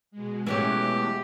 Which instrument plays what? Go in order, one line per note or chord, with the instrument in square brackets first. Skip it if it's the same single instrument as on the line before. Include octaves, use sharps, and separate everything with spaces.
[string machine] B2 G#3
[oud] E3 F#3 C#4 [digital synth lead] A3 [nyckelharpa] G4